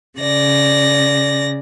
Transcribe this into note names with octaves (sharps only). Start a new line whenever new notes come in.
C#3 D5 A#6